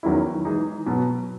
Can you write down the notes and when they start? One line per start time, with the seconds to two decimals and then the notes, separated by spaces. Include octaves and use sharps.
0.03 E2 D#3 F#3 C#4 E4
0.45 E3 G#3 D#4 G#4
0.87 B2 F#3 B3 F#4